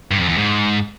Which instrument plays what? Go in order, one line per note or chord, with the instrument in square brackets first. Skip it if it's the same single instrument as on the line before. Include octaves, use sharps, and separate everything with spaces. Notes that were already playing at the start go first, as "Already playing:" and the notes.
[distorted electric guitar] G2
F2
E2
G#2